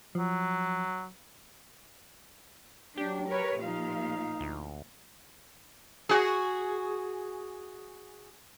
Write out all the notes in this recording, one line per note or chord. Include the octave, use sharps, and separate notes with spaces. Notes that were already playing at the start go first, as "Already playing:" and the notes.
F3 F#3
F#3 D4 G4
A#4 B4 C#5
A#2 F3 D#4 F5
D2
F#4 G#4